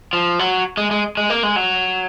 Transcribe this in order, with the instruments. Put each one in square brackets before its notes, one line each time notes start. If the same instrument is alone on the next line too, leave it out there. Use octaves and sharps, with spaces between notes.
[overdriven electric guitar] F3
F#3
G#3
G#3
G#3
A#3
G#3
F#3